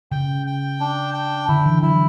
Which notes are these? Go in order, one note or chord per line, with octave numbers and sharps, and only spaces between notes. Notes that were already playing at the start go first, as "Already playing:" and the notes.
C#3 G5
G5
D4
G5
D3 E4
E3
F#3 E4